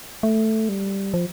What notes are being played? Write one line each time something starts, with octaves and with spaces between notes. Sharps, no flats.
A3
G3
F3